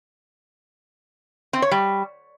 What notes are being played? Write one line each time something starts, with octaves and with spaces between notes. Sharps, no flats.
C4
C#5
G3